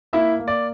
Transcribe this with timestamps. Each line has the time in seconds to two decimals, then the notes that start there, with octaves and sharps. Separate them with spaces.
0.13 A#3 E4 E5
0.40 A#3
0.48 D5